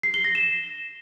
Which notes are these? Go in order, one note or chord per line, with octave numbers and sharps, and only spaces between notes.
C7
G7
A#6
E7